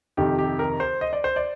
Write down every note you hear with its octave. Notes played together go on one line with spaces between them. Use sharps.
F2 C3 D#3 G4
G4
A#4
C5
D#5
D5
C5
D5